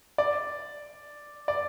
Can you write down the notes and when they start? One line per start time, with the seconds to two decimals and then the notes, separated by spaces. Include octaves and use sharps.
0.18 D5
1.48 D5